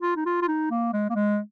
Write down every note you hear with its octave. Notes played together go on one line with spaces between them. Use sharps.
F4
D#4
F4
F4
D#4
A#3
G#3
A#3
G#3